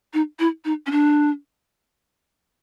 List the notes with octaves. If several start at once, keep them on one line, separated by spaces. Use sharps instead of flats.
D#4
E4
D#4
C#4
D4